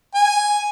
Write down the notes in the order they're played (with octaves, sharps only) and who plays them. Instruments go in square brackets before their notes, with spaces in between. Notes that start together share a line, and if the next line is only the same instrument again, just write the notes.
[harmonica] G#5